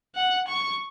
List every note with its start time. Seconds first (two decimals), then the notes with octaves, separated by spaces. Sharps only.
0.15 F#5
0.48 C#6